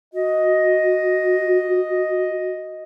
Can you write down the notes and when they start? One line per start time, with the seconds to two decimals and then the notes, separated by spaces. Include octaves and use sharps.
0.14 F#4 D#5